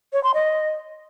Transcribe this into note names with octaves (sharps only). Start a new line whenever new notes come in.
C#5
C6
D#5